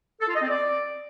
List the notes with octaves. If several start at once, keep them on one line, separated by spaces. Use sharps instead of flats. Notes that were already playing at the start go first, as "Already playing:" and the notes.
A4
F4
D#5
C4
D5